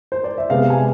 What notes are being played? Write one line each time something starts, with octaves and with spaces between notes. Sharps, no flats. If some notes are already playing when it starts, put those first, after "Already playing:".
C5
D5
E5
C3 G#3 B3 F5
G#5